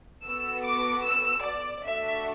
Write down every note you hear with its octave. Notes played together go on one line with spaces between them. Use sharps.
B3 F#4 A4 E6
D6
E6
D5
A3 D4 F#4 A4 E5